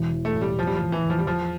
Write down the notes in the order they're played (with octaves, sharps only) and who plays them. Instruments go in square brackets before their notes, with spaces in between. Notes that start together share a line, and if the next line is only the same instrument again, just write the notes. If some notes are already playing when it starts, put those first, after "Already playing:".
Already playing: [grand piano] E1 E3
E3
[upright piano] A3
[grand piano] A2
[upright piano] G3
[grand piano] E2 [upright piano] F3
[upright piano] G3
F3
[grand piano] E2
[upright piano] E3
[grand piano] E2
[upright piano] F3
G3
[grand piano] E2 [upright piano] F3